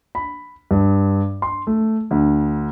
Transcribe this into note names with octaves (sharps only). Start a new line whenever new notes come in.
B5
G2
C6
A3
D2